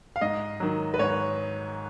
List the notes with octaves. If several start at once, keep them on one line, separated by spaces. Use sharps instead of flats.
F5
G#2 D#5
D#3 F#3
B4
G#2 C#5